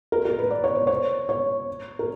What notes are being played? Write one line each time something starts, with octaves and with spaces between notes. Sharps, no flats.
A#4
A#4
B4
D5
C#5
C5
C#5
C#5
A#4